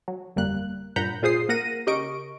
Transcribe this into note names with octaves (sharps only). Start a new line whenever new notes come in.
F#3
G1 F2 G3 A#3 F#6
G2 A#2 F#5 A#5 B5 G6
A#2 F4 G#4 C5 D#6 C7
A#3 A#4 F#5 A#6 D#7
C#3 G4 A#4 D#5 C#6 D7